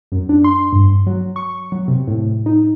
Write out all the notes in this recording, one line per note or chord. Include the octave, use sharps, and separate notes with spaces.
F#2
D4
C6
G2
F#3
C#6
F#3
C3
A2
D#4